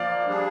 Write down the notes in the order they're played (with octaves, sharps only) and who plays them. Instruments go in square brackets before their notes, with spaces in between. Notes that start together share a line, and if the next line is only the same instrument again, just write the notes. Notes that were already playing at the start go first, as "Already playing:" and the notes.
Already playing: [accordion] F3 A#3 [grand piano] D5 F5
[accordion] G3 D4 G#4